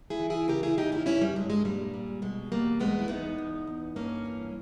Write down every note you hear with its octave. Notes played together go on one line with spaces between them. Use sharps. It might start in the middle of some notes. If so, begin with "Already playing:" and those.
E4 G#4
E3
E4 G#4
C#3 G4 A#4
E4 G#4
E2 D#4 G4
C#4 E4
G2 C#4 E4
G3
G2 G#3
G#3
A#2 G3
A#2
B2 G#3
E2 G3 A#3
E2 G#3 B3
E4
E2 B3 D#4
E2
E2
G2 A#3 C#4
E3